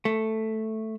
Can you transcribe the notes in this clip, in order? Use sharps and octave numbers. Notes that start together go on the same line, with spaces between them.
A3